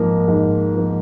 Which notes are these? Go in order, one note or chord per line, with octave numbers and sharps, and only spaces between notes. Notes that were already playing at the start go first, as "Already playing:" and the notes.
Already playing: G#2 F3 A#3
G#2
F3 A#3